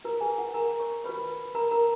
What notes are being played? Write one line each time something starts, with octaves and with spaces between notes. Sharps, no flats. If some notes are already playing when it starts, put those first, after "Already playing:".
F#4 A#4 B4 A#5
G#4 G#5
F#4 F#5
A#4 A#5
C#5 C#6
F#4 B4 C#5 B5
A#4 A#5
A#4 A#5